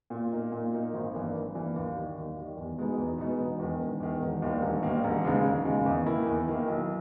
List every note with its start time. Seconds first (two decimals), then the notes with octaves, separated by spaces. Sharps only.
0.10 A#2
0.32 A#3 D#4
0.52 A#2
0.73 A#3 D#4
0.94 G#1
1.13 G2 E3 A#3
1.34 G#1
1.55 G2 E3 A#3
1.76 D#2
1.96 D#3 G3
2.16 D#2
2.36 D#3 G3
2.57 E2
2.78 B2 G#3 B3 D#4
2.98 E2
3.18 B2 G#3 B3 D#4
3.40 E1
3.59 E2 D#3
3.80 E1
4.00 E2 D#3
4.21 E1
4.42 D#2 D#3 G3 A#3
4.62 E1
4.83 D#2 D#3 G3 A#3
5.04 E1
5.24 D#2 C#3 G#3 D#4
5.44 E1
5.65 D#2 C#3 G#3 D#4
5.86 E2
6.06 D#3 A#3 E4
6.26 E2
6.47 D#3 A#3 E4
6.68 B1